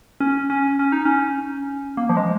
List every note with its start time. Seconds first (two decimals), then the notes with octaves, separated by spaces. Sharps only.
0.20 C#4
0.50 C#4
0.79 C#4
0.92 D#4
1.05 C#4
1.97 A#3
2.09 F3
2.17 G#3